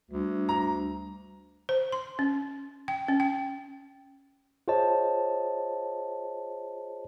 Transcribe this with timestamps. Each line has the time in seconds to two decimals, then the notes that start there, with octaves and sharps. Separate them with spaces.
0.11 D2 G3 D4
0.49 A#5
1.69 C5
1.92 C6
2.19 C#4
2.88 G5
3.08 C#4
3.20 G5
4.68 F4 G#4 C5 C#5 D#5 A5